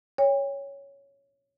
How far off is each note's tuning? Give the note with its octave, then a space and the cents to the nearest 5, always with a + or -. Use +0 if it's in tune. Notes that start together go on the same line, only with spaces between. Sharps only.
C#5 +5 G5 +40